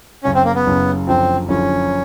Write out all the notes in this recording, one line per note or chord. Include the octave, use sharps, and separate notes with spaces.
F#1 F#2 C#3 C#4
C4
A#3
B3
F#1 F#2 C#3
F#1 F#2 D3 F3 C4
F#1 F#2 D3 F3 C#4